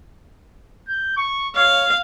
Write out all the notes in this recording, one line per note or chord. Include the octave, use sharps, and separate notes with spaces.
G6
C#6
C#5 F5